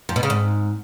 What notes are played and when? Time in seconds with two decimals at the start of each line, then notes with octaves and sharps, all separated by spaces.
0.09 F2
0.16 B2
0.23 C#3
0.30 G#2